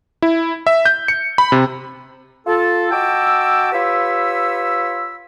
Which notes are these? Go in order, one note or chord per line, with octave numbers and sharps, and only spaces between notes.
E4
E5
G6
C#7
B5
C3
F4 A4
F#4 D#5 G5 A5 D6 E6
F4 G4 B4 C#5 B5 E6